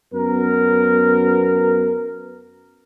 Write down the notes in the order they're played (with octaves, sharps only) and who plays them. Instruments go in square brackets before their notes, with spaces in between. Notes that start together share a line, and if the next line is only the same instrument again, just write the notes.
[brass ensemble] F#2 B3 A#4